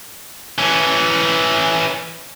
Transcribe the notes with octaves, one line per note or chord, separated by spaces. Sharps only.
E3 C#4